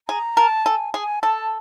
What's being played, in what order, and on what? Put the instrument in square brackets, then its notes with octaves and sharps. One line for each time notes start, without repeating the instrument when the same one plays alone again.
[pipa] G#4 [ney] A#5
[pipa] A#4 [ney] A5
[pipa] A4 [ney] G#5
[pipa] G#4 [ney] G#5
[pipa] A4 [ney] A5